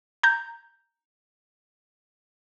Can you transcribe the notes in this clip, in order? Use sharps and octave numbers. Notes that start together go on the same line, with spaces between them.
A#5 G6